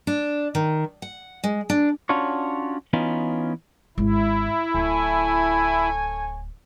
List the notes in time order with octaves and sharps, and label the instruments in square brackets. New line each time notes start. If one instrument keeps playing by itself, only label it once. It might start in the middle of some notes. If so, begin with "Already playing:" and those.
[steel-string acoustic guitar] D4
D#3
F#5
G#3
D4
[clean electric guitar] C#4 D4 F4 F#4 C#5
E3 B3 C#4 D#4 F4
[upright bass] G#1 [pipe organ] E4
[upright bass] D1 [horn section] A4 C#5 G#5